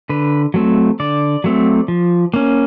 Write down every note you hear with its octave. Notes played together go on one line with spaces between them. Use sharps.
D3 B4
F#3 A3 C4
D3 D5
F#3 A3 C4
F3
A#3 C#4